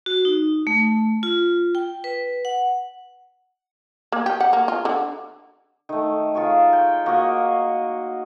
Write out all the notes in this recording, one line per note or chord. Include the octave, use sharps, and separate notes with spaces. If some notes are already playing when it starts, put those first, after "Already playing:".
F#4
D#4
A3
F4
G5
B4
F#5
A#3
G4
F#5
A#3
F4
D3
D#3 A3
F4 G#4 A#4 C#5
G5
A#3 F#4 C#5 D#5